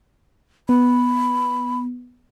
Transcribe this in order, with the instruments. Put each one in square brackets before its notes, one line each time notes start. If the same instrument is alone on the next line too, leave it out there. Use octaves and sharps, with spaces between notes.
[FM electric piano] B3 [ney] B5